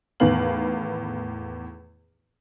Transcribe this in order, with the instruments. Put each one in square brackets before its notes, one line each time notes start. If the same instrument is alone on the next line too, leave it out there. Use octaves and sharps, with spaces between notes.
[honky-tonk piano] E2 A2 D#3 B3 F5 F#7